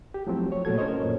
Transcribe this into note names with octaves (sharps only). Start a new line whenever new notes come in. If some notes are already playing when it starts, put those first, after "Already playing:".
G4
F3 F#3 A3 C4 E4
C#5
A#2 A3 F#4 A4 G#6
C#4 A#4 C5 C#5 D#5
F#2 A#2